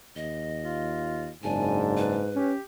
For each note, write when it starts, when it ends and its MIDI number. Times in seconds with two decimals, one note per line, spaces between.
0.16 1.30 39
0.16 1.29 75
0.63 1.31 65
1.43 2.19 30
1.43 2.43 44
1.43 2.26 62
1.43 1.80 80
1.97 2.51 71
2.35 2.56 61
2.35 2.62 67